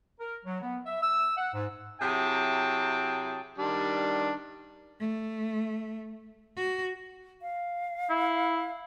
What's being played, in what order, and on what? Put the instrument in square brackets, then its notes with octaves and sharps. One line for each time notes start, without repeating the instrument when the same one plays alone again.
[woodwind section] A#4
F#3
B3
E5
E6
F#5
G#2
[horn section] C3 F#3 E4 G#4 G5 A5
[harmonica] D#3 G3 D4
[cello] A3
F#4
[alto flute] F5
[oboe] E4